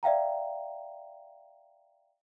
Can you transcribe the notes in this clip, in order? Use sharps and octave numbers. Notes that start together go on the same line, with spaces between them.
D5 E5 F5 G5 A#5